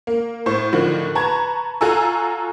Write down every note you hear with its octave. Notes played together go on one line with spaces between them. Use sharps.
A#3
A2 C5 C#6
A2 D3 D#3 F3 F#4
B4 A5 A#5 C#6 G#6
F4 F#4 A4 G#5 A#5 E6